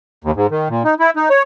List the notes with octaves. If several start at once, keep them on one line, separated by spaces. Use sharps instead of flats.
D#2
G#2
D#3
A#2
D#4
E4
D#4
C#5